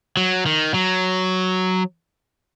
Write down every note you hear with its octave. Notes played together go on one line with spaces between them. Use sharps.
F#3
D#3
F#3